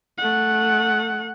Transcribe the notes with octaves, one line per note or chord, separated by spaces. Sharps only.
A3 F#5